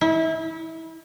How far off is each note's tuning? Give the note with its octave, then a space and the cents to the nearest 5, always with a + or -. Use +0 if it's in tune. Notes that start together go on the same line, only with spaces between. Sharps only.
E4 -30